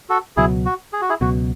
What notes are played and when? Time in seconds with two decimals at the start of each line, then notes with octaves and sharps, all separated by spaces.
0.09 F#4 A4
0.37 C#2 B2 F#3 E4 G#4
0.66 F#4
0.93 G#4
1.02 F#4
1.09 E4 G#4
1.21 C#2 B2 F#3 F#4